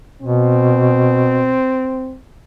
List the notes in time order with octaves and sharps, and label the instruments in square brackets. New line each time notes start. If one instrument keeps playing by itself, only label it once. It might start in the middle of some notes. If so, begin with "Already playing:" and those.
[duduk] B2 [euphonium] C4